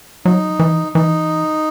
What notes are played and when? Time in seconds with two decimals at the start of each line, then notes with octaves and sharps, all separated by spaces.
0.25 F#3 D#4
0.59 E3
0.95 E3 D#4